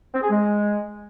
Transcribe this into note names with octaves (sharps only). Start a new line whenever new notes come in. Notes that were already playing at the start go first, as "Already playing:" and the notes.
C4
G#4
G#3